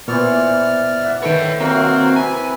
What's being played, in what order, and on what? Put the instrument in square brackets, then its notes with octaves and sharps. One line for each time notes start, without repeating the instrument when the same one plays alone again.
[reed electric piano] A#2 B3 E6 [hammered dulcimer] E3 C5 C#6 [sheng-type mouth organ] D5 F6
[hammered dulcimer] E5 F#5
[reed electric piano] D#3 A4 B4 [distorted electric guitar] C#5 G5
[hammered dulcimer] C3 F#3 [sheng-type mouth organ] A#3 F#4 A#4 [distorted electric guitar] C4
[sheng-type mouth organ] E4 B4 [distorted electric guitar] G#5